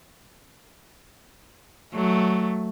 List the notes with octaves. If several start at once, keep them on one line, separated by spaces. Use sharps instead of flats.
F#3 A3